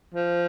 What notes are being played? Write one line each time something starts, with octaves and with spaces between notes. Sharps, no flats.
F3